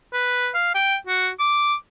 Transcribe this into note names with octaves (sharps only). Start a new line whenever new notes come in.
B4
F5
G5
F#4
D6